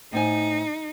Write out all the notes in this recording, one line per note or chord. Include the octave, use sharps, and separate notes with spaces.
A2 D#4 C5 G#5